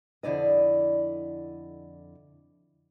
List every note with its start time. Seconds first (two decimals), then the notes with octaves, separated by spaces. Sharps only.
0.23 F2 D3 E4 D5 D#5